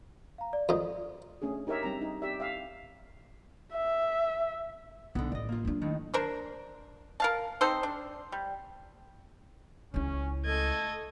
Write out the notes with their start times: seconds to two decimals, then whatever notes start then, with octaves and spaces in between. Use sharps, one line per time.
0.38 F5 A#5
0.53 D5
0.69 F2 D#4
1.42 A3 C#4 D4 G#4
1.67 D#4 G4 A#4 C#5 E5 A#5
1.83 G3 C4 A#5
2.01 D#4
2.22 G4 D5 E5
2.40 E5 F5
3.74 E5
5.15 B1 D3 B3
5.32 A1 D5 D#5
5.49 A#3 F4
5.65 F#3 D4
5.81 A2 D#3 D#4
6.14 D4 A#4 C5
7.20 A#4 F5 A5
7.61 C4 D#4 A4 C5
7.83 D4
8.32 G3
9.94 C#2 C#4 E4
10.45 A3 A4 D#5 G#6